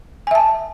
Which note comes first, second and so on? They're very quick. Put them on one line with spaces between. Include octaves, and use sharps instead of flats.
G#5 E5 A5